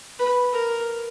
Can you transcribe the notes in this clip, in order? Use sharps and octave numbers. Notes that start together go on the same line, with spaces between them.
B4
A#4